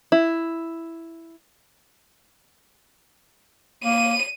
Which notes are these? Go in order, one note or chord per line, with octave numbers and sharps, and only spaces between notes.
E4
A#3 D#7